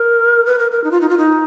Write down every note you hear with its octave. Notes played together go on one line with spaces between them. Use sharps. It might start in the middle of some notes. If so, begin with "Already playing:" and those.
Already playing: A#4
B4
A#4
A#4
D#4
F4
D#4
F4
D#4